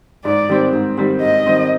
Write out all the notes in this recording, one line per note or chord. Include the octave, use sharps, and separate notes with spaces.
G#2 D5
D#3 G3 C4
G#2
D#3 G3 C4
G#2 D#5
D#3 G3 C4